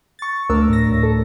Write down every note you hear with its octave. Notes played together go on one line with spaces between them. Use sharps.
C#6 A6
D2 A3 D4 A#4 E6
A2 A#6
D2 A2
A4